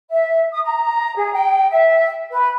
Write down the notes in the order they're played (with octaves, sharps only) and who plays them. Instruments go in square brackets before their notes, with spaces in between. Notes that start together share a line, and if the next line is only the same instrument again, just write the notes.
[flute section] E5
D#6
A#5
G#4
G5
E5
B4